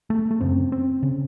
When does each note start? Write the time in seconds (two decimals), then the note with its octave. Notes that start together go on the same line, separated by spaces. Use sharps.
0.10 A3
0.31 A3
0.41 F#2 C#3 C4
0.72 C4
1.03 C#3